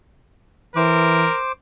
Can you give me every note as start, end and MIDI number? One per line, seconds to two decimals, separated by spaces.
0.76 1.27 52
0.76 1.40 70
0.76 1.52 72
0.76 1.52 86